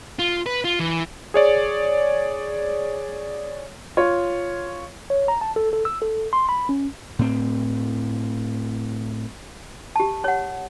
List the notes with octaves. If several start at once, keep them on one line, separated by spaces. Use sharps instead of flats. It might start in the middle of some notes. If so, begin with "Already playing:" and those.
F4
B4
F4
E3
G#4 C#5 D5
F4 C#5
C#5
A#5
A5
A4
A4
E6
A4
C6
B5
C#4
A2 C4
G4 A5
C#5 F#5